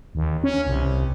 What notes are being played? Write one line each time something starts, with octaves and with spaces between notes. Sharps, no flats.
D#2
C#4
C2